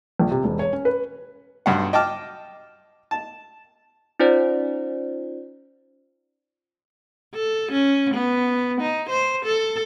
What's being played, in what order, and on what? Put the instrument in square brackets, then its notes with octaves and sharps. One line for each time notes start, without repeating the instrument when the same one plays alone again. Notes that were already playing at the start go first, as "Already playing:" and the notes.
[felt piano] A#1
C3
E1
C#5
C#4
B4
[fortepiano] B1 G2 F#5
D#5 G5 A5 D6 F6
A5
[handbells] C#4 D#4 F4 C5 D5
[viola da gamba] A4
C#4
B3
D#4
C5
A4